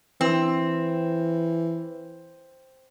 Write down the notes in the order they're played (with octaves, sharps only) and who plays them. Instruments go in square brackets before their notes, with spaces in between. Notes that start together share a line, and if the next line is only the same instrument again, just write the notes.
[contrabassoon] E3 [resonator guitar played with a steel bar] C4